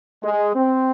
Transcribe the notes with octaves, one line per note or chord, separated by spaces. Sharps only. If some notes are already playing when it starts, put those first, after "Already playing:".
G#3
C4